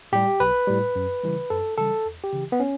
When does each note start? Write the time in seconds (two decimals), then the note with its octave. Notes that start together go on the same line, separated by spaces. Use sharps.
0.12 A2 G3 G4
0.40 B1 B4
0.67 A2 G3
0.95 F#2
1.23 C#3 E3 G3
1.50 F#2 A4
1.78 C#3 E3 G3 A4
2.05 E2
2.24 G4
2.33 C#3 E3
2.52 B3
2.60 C#4